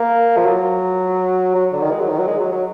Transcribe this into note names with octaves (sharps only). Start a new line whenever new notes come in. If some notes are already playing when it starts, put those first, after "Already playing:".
Already playing: A#3
F3
F#3
F#3
D3
D#3
G#3
F#3
D#3
F#3
G#3
F#3
F#3